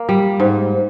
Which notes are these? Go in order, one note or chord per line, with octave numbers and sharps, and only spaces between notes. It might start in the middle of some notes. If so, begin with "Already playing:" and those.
Already playing: A#3
G3
G#2